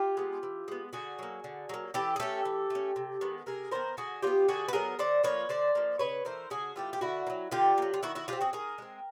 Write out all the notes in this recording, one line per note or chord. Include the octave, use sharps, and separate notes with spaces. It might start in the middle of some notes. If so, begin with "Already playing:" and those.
Already playing: F4 G4
G#3 B3
E3
G#3 B3
D3 F#4 G#4
F#3 A#3
D3
F#3 A#3
E3 G4 A4
G#4
A3 C#4 G4 A4
E3
A3 C#4
C3
D#3 G#3 B3
C3 G#4 A#4
D#3 G#3 B3 A#4 C5
D3 F#4 G#4
F#3 B3 F4 G4
D3 F#4 G#4
B4
F#3 B3 G#4 A#4
D3 C5 D5
F3 A#3 B4 C#5
D3 C5 D5
F3 A#3
C#3 B4 C#5
E3 A3 A#4 C5
C#3 F#4 G#4
E3 A3 F4 G4
G4
D3 E4 F#4
A#3
F#3
D3 F4 G4
A#3
F#3
F4
D#3 E4 F#4
E4 F#4
G#3 C4 F4 G4
F#4 G#4
D#3 G#4 A#4
G#3 C4